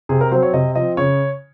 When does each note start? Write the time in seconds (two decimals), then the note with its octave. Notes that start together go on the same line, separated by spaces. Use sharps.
0.09 C3 G#4
0.21 A#4
0.31 F#3 C5
0.35 C4
0.42 C#5
0.53 C3 D#5
0.75 F3 C4 D#5
0.97 C#3 C#5